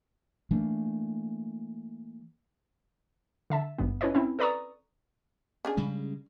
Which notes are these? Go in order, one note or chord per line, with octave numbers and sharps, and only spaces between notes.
E3 A3 A#3 D4
D3 E5 A5
G#1 G2 B3
C#4 E4 B4 C#5 D#5
C4 C#4 E4
A4 B4 D5 A#5 C#6 D#6
C#4 D4 G#4
C#3 G3 G#3